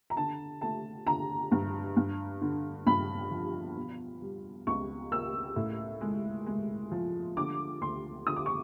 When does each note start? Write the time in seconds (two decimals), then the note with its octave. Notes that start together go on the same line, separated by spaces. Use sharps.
0.10 A#5
0.17 D3 A5
0.61 A3 A5
1.06 D3 A#5
1.51 G2
1.96 G2
2.42 D3
2.86 G2 B5
3.31 F3
3.77 B2
4.22 G3
4.67 C#2 C#6
5.11 A#3 E6
5.56 A2
6.01 G#3
6.46 G#3
6.92 F3
7.37 D3 D6
7.81 D2 C6
8.26 D3 D#6
8.36 D6
8.46 C#6